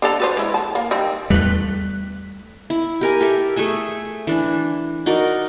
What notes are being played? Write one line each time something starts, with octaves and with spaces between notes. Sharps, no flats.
D4 A4 A#5
F#4 B4 C5
G#3 E4
A5
A#3
D#3 G3 C4
E2 G3 A3 F#6 B6
E4
G4 A#4 G#5
G4 A4 E5
A3 G#4 E5 G#5
E3 D4
D#4 F#4 A#4 D5